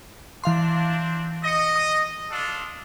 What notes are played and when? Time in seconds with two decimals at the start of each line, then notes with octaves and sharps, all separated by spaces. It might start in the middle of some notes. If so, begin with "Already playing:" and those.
0.44 E3 C4 D4 F5 C6
1.44 D#5 A#6 C#7
1.76 D#6
2.31 D4 F4 A4